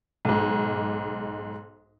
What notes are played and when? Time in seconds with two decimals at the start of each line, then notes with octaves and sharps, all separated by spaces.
0.25 B1 G#2